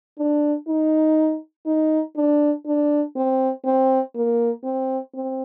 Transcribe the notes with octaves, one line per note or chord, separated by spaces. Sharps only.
D4
D#4
D#4
D4
D4
C4
C4
A#3
C4
C4